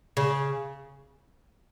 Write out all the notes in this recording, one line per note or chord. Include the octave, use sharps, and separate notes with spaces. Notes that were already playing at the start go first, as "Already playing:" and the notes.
C#3